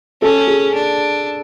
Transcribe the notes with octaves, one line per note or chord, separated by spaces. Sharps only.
C#4 A4
G#4
D4